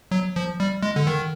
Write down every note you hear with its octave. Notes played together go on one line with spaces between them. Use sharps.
F#3
F3
G3
G#3
D3
D#3